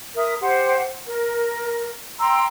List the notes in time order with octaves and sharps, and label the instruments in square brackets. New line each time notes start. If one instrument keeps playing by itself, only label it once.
[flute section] A#4 E5 D#6
G4 C5 F#5
A#4
G5 A#5 C6 E6